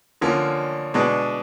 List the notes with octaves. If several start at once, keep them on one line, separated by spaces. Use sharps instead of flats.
D3 F3 A#3 C#4
B2 G#3 B3 D4